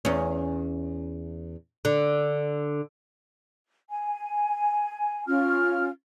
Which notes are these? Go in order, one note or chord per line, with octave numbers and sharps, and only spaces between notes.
E2 C#4
D3
G#5
C#4 F4 F6